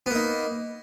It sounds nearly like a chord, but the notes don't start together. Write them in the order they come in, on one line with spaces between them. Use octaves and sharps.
B3 A#3 D#4